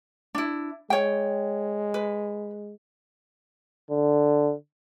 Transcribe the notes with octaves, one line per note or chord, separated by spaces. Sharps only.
D4 E4
G#3 C#5 G5
B4
D3